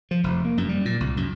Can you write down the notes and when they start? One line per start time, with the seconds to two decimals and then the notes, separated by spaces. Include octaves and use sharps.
0.11 F3
0.24 F1
0.45 A#3
0.57 F#2
0.69 G3
0.85 A#2
1.00 C2
1.17 F#2